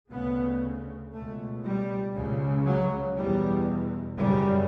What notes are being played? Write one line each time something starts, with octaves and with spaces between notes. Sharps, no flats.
D2 C#3 B3
C#2 B2 A3
G3
C#2 C#3
F#3
E2 B2 G3
F#2 C#3 G3